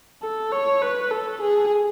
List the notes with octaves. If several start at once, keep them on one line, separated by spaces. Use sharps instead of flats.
A4
C#5
B4
A4
G#4